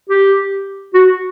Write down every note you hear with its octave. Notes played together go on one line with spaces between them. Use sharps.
G4
F#4